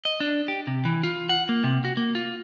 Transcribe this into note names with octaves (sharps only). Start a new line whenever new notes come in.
D#5
D4
G4
C3
E3
F4
F#5
A#3
C3
F#4
A#3
F4